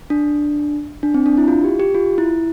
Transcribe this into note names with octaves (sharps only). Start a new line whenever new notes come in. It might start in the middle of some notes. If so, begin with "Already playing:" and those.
D4
D4
C4
D4
E4
F4
G4
G4
F4
E4